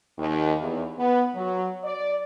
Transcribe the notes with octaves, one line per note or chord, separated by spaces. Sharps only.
D#2
E2
B3
F#3
D5